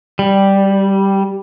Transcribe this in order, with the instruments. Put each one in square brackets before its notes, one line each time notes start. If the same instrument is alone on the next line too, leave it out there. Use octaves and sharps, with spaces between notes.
[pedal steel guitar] G3